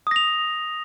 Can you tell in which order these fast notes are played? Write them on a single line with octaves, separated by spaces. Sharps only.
D#6 A#6 F7